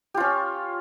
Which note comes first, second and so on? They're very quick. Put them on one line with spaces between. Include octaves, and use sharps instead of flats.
G4 F4 C#4